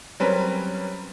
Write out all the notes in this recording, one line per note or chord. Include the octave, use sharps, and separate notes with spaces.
F#3 G3 C4 C#4 A#4 B4